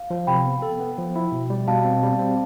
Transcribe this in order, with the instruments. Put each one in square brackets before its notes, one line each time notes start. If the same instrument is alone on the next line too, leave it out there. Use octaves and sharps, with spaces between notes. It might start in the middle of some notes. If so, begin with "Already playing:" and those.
Already playing: [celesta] F5
[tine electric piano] F3
[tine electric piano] C3 [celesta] G5 B5
[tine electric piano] B3
A4
B3
F3
E4
B2
G3
[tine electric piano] B2 [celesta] F5 A5
[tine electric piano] C4
G3
C4